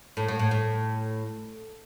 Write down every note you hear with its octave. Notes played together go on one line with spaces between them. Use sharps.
A2
A2
A2
A2